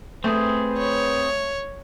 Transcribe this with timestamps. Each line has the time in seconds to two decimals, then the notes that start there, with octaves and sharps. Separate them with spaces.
0.24 A3 C4 G#4 B4
0.77 C#5